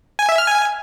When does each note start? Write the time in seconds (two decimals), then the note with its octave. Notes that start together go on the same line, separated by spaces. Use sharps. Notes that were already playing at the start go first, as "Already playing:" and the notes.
0.19 G#5
0.29 E5
0.38 F6
0.48 G#5